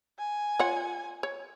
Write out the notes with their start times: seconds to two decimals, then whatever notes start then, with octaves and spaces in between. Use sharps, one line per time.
0.19 G#5
0.59 F4 C#5 F#5
1.23 C#5